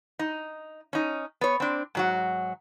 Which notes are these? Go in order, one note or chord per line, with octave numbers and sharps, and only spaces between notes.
D#4
C#4 D#4
B3 C#5
C4 D4
G#2 F#3 F#4